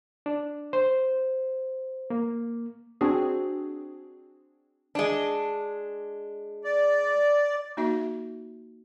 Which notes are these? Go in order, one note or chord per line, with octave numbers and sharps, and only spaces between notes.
D4
C5
A#3
C4 D4 F#4 G#4
G#3 D4
D5
A#3 D#4 F#4 E5